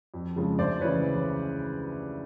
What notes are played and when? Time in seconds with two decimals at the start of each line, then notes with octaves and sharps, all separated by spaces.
0.14 F2
0.36 C#3 F3 G#3
0.59 D2 C5 D5
0.81 C#3 E3 B4 C#5